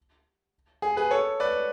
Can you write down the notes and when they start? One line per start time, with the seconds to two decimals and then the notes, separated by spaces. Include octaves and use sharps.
0.82 G#4
0.97 G#4 B4
1.11 A4 C#5
1.40 B4 D5